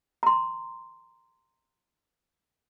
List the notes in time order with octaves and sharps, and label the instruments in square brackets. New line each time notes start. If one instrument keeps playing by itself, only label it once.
[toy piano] A#5 C6